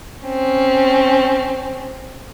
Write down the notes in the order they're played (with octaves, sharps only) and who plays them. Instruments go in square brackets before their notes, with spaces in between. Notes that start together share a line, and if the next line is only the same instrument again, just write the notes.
[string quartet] C4 C#4